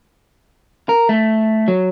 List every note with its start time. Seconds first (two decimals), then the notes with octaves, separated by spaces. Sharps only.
0.89 A#4
1.09 A3
1.68 F#3